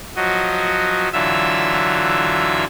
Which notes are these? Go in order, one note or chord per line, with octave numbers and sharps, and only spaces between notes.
F3 F#3 F#4 D#5
D3 E3 F#3 F4 E5 E6